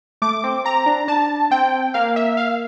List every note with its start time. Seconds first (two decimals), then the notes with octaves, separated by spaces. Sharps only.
0.22 A3 D6
0.44 C4
0.65 C4 A#5
0.86 D4
1.08 D4 A5
1.51 C4 G5
1.94 A#3 F5
2.16 E5
2.37 F5